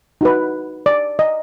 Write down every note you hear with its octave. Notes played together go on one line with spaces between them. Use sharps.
D#4 F#4 B4
D5
D#5